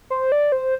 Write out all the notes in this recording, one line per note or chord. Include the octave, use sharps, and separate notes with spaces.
C5
D5
C5